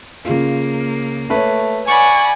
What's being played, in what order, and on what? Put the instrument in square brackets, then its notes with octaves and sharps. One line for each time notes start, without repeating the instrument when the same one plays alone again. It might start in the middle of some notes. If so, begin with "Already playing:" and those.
[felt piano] C#3 F4 [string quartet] A#3
[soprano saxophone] A3 [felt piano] B4 C#5
[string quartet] D5 F#5 B5 [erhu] G#5 [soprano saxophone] C#6